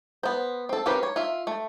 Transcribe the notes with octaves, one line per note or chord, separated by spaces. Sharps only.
B3 C5
C4 A4
C4 C#4 G4 A#4 B4
C#5
F4 E5
A3